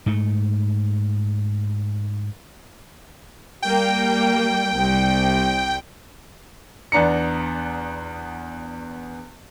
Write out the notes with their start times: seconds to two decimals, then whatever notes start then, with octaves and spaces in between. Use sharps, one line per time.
0.06 G#2 A3
3.62 G3 A#3 G5
4.76 C2
6.92 E2 B3 D4 A#5 C#7